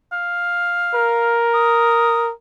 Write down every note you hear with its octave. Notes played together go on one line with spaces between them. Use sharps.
F5
A#4
D#6